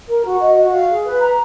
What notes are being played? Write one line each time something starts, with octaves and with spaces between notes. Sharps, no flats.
A#4
F#4
D#5
F#4
F5
G#4
B4
A#5